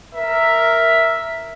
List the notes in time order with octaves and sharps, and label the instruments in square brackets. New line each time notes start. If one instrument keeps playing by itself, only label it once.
[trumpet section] A#4 E5